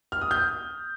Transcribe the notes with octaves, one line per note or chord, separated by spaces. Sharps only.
F6
D#6
G6